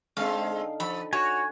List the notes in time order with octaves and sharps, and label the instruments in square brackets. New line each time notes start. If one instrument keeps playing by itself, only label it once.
[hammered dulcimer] D3 D#4 G5 [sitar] G#3 C4 [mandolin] F5
[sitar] F3 [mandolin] B5
[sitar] F#4 [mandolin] C#5 [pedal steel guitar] G#5 C#6